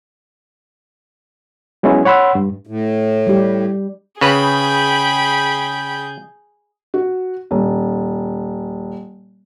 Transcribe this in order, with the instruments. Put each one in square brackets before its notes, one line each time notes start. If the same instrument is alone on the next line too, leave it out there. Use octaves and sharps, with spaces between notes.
[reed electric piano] F#3 G#3 B3 C#4 E4
C#5 F#5 B5 C6 E6
G2
[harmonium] A2
[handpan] G3 G4
[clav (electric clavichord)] C#3 B4 [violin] G#4 G6 [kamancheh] G5 B5
[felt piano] F#4
D#1